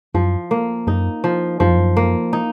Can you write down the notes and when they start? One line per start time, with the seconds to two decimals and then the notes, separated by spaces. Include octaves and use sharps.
0.15 F#2 F3
0.51 A#3
0.87 F#2 D#4
1.24 F3
1.60 F#2 F3
1.69 F2
1.77 F#2
1.97 A#3
2.33 D#4